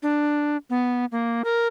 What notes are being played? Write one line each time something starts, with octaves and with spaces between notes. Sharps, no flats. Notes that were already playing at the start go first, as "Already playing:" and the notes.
D4
B3
A#3
A#4